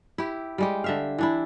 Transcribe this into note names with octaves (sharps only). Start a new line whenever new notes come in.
E4 G4
G3 G#3 G4
D3 E5 F5
E3 D4 E4